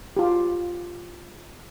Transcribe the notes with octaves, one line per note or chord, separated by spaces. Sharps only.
F4 G4